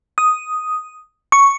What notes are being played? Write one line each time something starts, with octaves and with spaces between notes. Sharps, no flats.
D#6
C#6